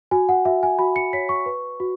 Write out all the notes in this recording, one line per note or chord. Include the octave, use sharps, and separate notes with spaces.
F#4 G#5
F#5
F#4 E5
G#5
F#4 B5
C#7
C#5 B6
C#6
B4
F#4